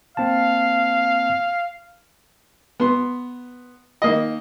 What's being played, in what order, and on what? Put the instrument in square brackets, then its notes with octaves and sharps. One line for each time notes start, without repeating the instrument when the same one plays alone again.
[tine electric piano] A#3 C4 A5 [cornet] F5
[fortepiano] B3 C6
D#3 A#3 D#5